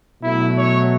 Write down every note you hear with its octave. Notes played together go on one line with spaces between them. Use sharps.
B2 F#3 A3 E4
C#5